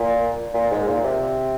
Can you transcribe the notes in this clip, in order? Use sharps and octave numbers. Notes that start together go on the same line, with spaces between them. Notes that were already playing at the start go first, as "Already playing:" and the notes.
Already playing: A#2
A#2
G#2
A#2
C3